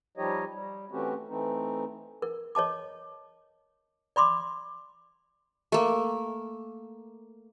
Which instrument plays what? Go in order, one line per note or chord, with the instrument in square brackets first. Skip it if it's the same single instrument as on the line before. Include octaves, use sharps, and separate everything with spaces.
[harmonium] F3 G3 D#4 G4 C#5 D#5
G3
E3 A3 C4 C#4 F#4 G4
E3 A3 C4 D#4
[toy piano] A#4
C#5 D#5 A5 D6
D5 B5 C6 D6
[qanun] A3 A#3